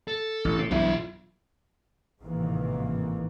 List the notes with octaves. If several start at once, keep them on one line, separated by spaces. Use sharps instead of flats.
A4
A1
A2
B1 G2 E3 F4 E5
A1 G#2 C3 D#3 E3 A#3